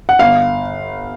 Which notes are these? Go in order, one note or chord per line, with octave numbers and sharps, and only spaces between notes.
F#5
G1 F5